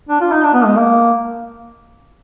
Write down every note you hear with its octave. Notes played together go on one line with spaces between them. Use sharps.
D4
F4
D#4
D4
B3
G#3
A#3